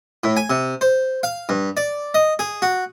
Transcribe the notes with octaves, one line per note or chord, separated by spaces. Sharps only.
A2
G#5
C3
C5
F5
G2
D5
D#5
G#4
F#4